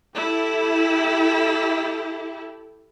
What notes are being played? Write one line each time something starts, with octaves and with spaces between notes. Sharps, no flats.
E4 G4 A4